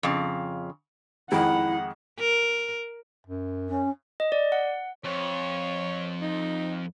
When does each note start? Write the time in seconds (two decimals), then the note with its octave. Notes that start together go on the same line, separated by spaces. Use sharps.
0.03 F2 C#3
1.32 F2 D#3 G#3 E4 F#5 B5
2.20 A#4
3.26 F#2
3.69 C#4
4.20 D#5
4.32 D5
4.52 F#5
5.05 F2 C#5
6.22 D#4